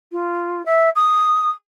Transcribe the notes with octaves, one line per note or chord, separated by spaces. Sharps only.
F4
E5
D#6